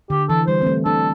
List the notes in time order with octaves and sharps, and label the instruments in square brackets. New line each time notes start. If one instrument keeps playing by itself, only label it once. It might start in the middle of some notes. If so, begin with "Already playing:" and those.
[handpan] D3 [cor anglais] G4
[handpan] E3 [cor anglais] A4
[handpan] G3 [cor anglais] C5
[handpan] C4
A3
[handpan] D4 [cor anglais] A4